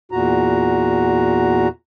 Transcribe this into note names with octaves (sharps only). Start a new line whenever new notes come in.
E2 A#2 F#4 A#5